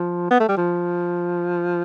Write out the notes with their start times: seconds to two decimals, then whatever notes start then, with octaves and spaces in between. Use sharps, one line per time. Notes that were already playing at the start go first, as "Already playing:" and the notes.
Already playing: F3
0.31 B3
0.40 A3
0.49 G3
0.57 F3